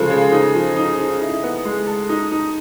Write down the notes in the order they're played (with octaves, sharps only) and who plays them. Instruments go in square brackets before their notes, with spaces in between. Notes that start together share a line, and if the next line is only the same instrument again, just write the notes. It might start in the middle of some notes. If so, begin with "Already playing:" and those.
Already playing: [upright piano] C#3 F3 G#3 F4 [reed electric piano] A4
[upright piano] C#3
D#4
F3
D#4
D#4
E4
B3
G#3
A4
D#4
D#4